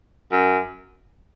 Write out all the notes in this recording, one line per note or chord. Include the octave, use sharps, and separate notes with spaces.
F#2